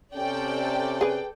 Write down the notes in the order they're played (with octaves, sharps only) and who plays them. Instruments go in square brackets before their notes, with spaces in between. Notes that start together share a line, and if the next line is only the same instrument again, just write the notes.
[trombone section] C3 C#4 [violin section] A4 D5 G5
[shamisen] G#4 B4